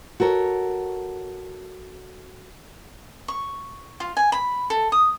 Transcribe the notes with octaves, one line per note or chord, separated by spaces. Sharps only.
F#4 A4 A#4 C#5
C#6
F4
G#5
B5
A4
D#6